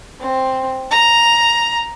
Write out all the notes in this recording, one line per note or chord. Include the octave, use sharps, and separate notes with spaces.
C4
A#5